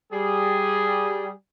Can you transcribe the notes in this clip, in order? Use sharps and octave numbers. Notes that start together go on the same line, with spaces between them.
G3 G#4